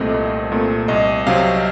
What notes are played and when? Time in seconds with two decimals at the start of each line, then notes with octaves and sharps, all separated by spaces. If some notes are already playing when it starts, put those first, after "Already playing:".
Already playing: C2 A#2 A3 C4 D#5
0.14 C2
0.52 A#2 A3 C4
0.88 C2 D#5
1.27 C3 F#3 C4 F5